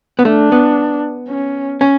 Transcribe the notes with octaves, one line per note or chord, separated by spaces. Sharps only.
B3
A3 D4
B3
C#4
C#4